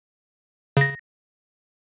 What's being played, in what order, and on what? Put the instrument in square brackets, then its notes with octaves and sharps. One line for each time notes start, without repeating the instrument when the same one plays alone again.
[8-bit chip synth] C#3 A#6